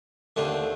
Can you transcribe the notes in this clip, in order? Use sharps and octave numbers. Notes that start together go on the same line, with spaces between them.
D#2 D3 A3 C4